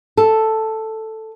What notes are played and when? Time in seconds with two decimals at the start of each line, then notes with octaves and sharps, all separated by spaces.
0.17 A4